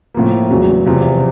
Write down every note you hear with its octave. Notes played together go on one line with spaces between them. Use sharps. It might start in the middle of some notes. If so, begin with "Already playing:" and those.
A2 F3 A#3
E2 C#3 F#3
E2 C3 F3